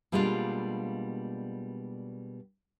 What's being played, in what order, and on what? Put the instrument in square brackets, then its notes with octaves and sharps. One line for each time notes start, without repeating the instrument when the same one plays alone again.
[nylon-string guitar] B2 G3 G#3 A#3 D4 F4